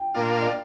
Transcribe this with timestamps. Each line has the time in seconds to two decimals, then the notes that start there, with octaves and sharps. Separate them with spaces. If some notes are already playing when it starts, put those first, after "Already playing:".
Already playing: G5
0.14 A#2 A#3 D4 F4
0.41 D5